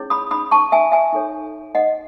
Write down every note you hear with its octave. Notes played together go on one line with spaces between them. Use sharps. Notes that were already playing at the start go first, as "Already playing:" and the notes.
Already playing: C#4 E4 G#4 C#5
B5 D#6
B5 D#6
A5 C#6
E5 G#5
E5 G#5
D#4 A4 C#5
D#5 F#5